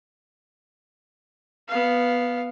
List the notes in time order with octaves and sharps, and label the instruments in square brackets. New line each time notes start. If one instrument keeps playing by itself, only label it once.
[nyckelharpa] B3 F5